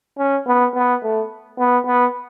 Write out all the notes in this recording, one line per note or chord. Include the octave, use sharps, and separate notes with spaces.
C#4
B3
B3
A3
B3
B3